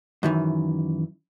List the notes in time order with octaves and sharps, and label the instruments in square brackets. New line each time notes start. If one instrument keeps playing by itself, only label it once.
[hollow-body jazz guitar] F#2 D#3 E3